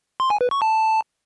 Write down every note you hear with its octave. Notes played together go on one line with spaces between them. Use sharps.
C6
G#5
B4
C#6
A5